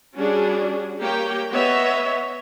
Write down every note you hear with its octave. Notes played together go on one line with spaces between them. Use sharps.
G3 C#4 D4 F#4 G#4
A#3 G4 C#5 G5
B3 C#5 D#5 E5